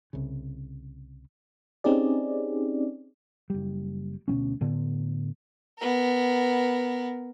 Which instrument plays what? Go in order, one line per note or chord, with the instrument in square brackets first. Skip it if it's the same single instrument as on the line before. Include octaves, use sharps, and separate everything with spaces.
[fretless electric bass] C2 C#3
[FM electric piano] C4 C#4 D#4 G4 G#4 D5
[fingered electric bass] F#1 G3
D2 B2 G3 C#4
A2 D3 B3
[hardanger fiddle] B3 A#4